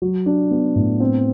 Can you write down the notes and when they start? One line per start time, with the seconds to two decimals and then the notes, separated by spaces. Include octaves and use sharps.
0.02 F#3
0.26 D4
0.51 B3
0.76 A2
1.00 C4